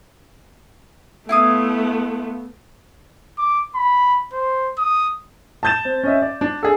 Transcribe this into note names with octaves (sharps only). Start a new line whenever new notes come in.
A3 B3 E4 F4 D#6
D6
B5
C5
D#6
A5 D#6 G6 A6 E7
C4
C#4 D#5 E5
D5
D4
G#4 A4